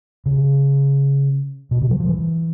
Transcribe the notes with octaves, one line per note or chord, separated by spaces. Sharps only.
C#3
B2
C#3
F#3
F3
E3